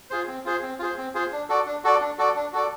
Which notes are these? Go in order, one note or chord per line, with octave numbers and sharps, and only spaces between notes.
F4 G#4 C5
C4
F4 G#4 C5
C4
F4 G#4 C5
C4
F4 G#4 C5
D4
F#4 A4 D5
D4
F#4 A4 D5
D4
F#4 A4 D5
D4
F#4 A4 D5